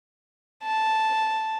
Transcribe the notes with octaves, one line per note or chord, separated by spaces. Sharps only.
A5